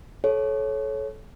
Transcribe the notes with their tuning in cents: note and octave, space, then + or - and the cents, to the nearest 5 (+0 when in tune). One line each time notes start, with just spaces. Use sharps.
A4 -30 C#5 -10